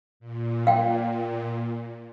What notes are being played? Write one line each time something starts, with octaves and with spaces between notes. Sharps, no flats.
A#2
F5 G5